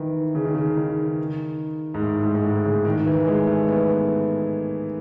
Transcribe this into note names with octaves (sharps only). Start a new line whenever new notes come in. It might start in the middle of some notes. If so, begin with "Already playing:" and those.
Already playing: D#3 E3
C#3
D#3
C#3
D#3
G#2
A2
G#2
G#2
A2
C#3
D#3
E3
G#3
A3
B3